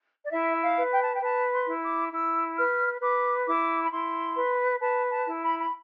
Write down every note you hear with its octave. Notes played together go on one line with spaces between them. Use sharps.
D5
E4 E5
F5
B4
G5
A5
G5
B4 A5
C6
E4
D6
E4 E6
B4 F6
B4 D6
E4 D6
B5
E4 C6
B4
B4 A5
A5
E4
B5
B5